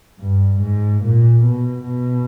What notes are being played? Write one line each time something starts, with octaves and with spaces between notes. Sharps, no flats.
G2
G#2
A#2
B2
B2